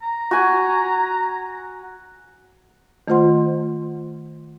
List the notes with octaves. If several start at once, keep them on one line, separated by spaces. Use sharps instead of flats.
A#5
F#4 G#5
D#3 A3 F4 C5 F#5 C6